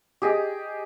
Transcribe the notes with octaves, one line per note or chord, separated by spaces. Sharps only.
G4 G#4 D#5